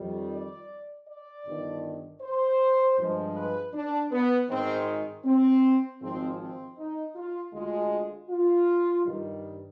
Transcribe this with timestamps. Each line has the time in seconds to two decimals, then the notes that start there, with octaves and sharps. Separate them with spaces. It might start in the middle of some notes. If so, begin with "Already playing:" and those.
Already playing: F2 D#3 G3
0.31 D5
1.07 D5
1.45 G1 G2 D#3
2.21 C5
2.97 G2 F3 G#3
3.35 B4
3.73 D4
4.11 B3
4.50 G#1 G#2 D#3 G#3 C4
5.25 C4
6.01 G#1 G#2 F3 G#3 C4
6.39 C4
6.78 D#4
7.15 F4
7.53 D2 D3 G#3 F4
8.30 F4
9.06 G2 D#3 G3